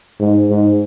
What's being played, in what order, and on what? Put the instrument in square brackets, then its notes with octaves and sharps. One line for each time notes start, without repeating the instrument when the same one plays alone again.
[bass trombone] G#2
G#2